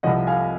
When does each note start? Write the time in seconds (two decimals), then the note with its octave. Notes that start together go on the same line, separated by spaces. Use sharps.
0.03 C2 C3 F3 D#5 F#5
0.27 F5 G#5